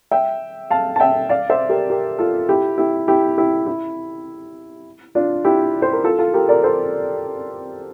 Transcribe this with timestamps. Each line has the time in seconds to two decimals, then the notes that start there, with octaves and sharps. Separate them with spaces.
0.11 E5 G5
0.70 F5 A5
0.96 A5
1.00 E5 G5
1.29 D5 F5
1.50 C5 E5
1.69 G4 A#4
1.90 G4 A#4
2.19 F4 A4
2.49 E4 G4
2.78 E4 G4
3.08 E4 G4
3.37 E4 G4
3.67 E4
5.15 D4 F4
5.45 E4 G4
5.82 C5
5.93 A#4
6.04 F4 A4
6.19 F4 A4
6.34 G4 A#4
6.49 A#4 D5
6.64 A4 C5